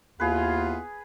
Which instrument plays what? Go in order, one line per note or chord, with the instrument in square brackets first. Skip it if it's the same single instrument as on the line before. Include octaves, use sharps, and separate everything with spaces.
[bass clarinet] D#2 [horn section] B3 E4 F4 [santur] G#4 B4